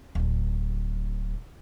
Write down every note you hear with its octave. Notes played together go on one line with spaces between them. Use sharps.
D1 D4